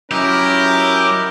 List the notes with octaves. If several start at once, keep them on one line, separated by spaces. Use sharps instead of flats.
F#3 C#4 E4 G4 A#4 D#5